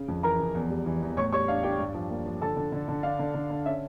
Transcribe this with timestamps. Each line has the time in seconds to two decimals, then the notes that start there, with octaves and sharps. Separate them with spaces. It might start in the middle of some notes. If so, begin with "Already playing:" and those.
Already playing: C#3
0.08 F2
0.23 E3 A#4 A#5
0.40 F2
0.55 E2
0.70 G3
0.86 E3
1.02 E2
1.17 A2 C#5 C#6
1.32 G3 C#5 C#6
1.48 D4 F5
1.63 D4 G4 G5
1.79 G2
1.94 F3
2.10 A#3
2.26 F3
2.41 D3 A4 A5
2.57 D3
2.72 D3
2.88 D3
3.03 D4 F5
3.19 D3
3.34 D3
3.50 D3
3.66 C#4 E5